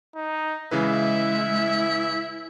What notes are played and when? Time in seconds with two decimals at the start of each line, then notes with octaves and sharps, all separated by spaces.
0.15 D#4
0.71 C#3 E3 G#3 E4 B4 E5